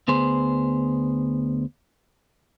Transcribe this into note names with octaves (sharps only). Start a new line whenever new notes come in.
D2 B3 G#4 C5